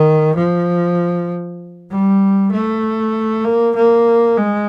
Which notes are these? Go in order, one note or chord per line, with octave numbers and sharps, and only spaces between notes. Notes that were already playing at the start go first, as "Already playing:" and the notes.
Already playing: D#3
F3
G3
A3
A#3
A#3
G#3